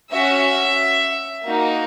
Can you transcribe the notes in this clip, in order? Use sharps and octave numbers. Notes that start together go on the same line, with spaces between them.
C#4 F#4 E5
A#3 D#4 F#4